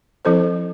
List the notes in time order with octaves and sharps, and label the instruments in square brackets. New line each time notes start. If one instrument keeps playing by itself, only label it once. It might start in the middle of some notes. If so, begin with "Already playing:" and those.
[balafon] F3 C4 E4 A4 C5